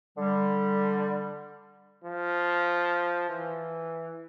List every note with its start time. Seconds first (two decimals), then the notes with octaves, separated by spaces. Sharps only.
0.17 D3 G3
2.04 F3
3.29 E3